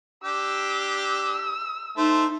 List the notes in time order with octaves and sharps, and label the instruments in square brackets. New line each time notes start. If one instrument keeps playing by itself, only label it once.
[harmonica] D4 G4 [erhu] E6
[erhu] E6
[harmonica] A3 C5 [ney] D#4